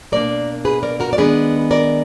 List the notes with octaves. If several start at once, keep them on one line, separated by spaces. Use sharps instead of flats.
B2 A#3 D4 A#4 D5
G#4 B4
A#4 D5
F#4 A#4
D5
D#3 G#3 B3 D4 G#4 B4
A#4 D5